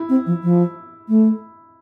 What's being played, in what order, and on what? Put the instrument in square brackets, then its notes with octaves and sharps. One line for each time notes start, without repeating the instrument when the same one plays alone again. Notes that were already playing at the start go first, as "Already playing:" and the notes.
Already playing: [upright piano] E4
[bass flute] C4
F3
F3
A3